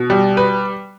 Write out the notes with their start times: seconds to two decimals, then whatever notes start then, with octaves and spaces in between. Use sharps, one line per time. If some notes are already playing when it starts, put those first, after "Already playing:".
Already playing: B2
0.10 G3
0.37 B4